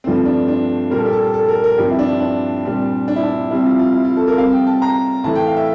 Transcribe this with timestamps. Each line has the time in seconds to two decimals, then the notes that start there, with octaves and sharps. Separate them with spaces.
0.04 G2 F3 A3 C4
0.25 D4
0.48 D4
0.90 A#2 G3 A#3 A#4
0.98 A4
1.06 G4
1.13 A4
1.34 A4
1.48 A#4
1.64 A#4
1.77 G2 F3 C4 G4
1.91 E4
1.99 D4
2.21 D4
2.65 A#2 G3 C4
3.08 D4
3.16 E4
3.23 D4
3.51 C3 G3 C4 E4
3.66 F4
3.79 F4
3.94 E4
4.05 F4
4.17 A4
4.27 A#4
4.38 C3 G3 C4 F5
4.53 G5
4.67 A5
4.82 A#5
5.24 A2 E3 A3 A5
5.35 G5
5.47 F5
5.57 E5